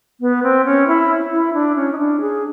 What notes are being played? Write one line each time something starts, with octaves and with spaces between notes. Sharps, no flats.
B3
C4
C#4
E4
E4
D4
C#4
D#4
D4
G#4